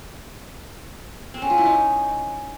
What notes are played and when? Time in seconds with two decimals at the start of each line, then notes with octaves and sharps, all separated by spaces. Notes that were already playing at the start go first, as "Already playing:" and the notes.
1.34 C4
1.42 C#4
1.50 F4
1.58 E4
1.66 D#4